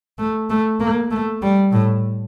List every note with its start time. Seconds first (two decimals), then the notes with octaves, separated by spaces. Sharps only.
0.18 A3
0.50 A3
0.80 A#3
1.11 A3
1.42 G3
1.72 A2